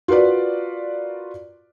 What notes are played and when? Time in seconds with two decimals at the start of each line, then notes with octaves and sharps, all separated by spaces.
0.08 F4 F#4 A#4 B4 D5